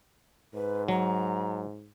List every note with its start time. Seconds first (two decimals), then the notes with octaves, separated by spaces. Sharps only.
0.54 G#2 B4
0.88 F#3 A#5